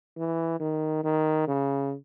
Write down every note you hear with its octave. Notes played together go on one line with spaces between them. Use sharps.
E3
D#3
D#3
C#3